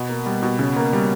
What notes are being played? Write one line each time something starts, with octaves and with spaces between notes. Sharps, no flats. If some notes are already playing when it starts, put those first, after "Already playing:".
Already playing: B2
A#3
G3
B2
C#3
A#3
G3